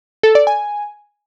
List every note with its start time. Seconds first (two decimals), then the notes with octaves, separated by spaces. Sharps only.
0.23 A4
0.35 D5
0.47 G#5